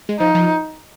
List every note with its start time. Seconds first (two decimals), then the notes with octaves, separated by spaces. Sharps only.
0.09 G#3
0.19 F3 D#4
0.35 F3